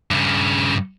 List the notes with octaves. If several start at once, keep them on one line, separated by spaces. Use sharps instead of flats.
G2 C#3